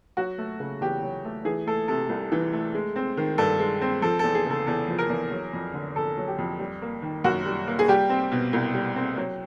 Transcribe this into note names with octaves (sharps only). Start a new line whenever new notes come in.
F#3 F#4
A3
C#3
E2 G4
F#3
A3
E3 G#4
A3 A4
C3 A4
C2
E3
A3
G#3
C4
D#3
G2 A4
G#3
C4
F3 A4
E2 A4
G#4
C#3 A4
E2 A4
F3
A#4
E2
F#3
F2
D3
F2 A4
F#3
G4
F2
G3
A#3
D#3
F#2 F#4
G3
A#3
G#4
G3 G4
C4
B2
C2
G3
C4
F#3